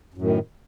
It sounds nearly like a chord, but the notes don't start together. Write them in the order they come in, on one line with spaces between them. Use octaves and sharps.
F#2 A2 D#3